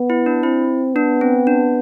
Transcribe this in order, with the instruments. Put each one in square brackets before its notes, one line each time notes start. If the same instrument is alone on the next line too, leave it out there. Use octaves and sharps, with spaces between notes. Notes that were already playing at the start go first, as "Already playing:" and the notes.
Already playing: [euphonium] B3
[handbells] E4
D4
[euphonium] C4 [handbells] E4
[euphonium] B3 [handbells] D4
[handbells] C4
D4